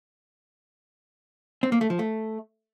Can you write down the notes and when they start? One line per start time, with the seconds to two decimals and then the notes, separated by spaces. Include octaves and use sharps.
1.63 C4
1.72 A#3
1.81 A3
1.90 F3
1.99 A3